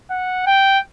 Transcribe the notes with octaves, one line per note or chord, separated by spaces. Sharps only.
F#5
G5